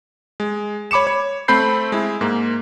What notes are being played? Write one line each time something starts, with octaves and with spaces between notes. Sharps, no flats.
G#3
C#5 B5 D6 C#7 E7
C#5
A3 C4 B5 G6 C7
G#3 E4
G#2 A#3